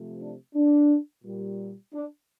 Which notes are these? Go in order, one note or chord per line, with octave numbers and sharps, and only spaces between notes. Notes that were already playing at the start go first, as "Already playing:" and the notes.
Already playing: C3 F3 A3
D4
D4
A#2 G3
D4